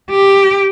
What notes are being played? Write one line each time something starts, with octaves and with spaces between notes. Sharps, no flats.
G4